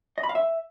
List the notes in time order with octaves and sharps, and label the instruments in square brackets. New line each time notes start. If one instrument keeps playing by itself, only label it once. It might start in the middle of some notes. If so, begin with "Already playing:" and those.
[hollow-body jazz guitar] D#5
B5
F5
E5